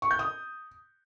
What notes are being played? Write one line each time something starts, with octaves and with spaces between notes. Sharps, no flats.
C#6
G6
D#6